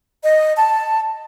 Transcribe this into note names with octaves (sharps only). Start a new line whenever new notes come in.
D#5
A5